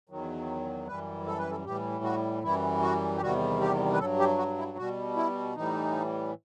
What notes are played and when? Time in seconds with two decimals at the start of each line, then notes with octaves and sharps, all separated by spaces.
0.09 E2 D#3 F#3
0.87 F#2 E3 G3 B4
1.27 A4
1.39 B4
1.51 A4
1.65 A2 E3 G3 G4
2.04 F#4
2.43 F#2 E3 G3 E4
2.82 F#4
3.16 G4
3.21 E2 C3 D#3 G3 F#4
3.61 G4
3.93 B4
3.99 G2 F#3 A4
4.19 G4
4.38 F#4
4.58 E4
4.77 B2 G3 F#4
5.16 E4
5.56 A2 E3 G3 D#4